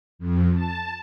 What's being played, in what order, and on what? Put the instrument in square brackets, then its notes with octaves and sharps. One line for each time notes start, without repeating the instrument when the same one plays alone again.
[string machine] F2
A5